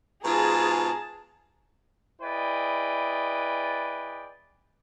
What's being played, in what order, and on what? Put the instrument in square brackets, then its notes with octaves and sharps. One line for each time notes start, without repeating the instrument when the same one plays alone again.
[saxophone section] G#2 B2 F4 [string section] G#4 A5 [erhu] A#5
[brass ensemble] E4 G#4 B4 D5 D#5 G5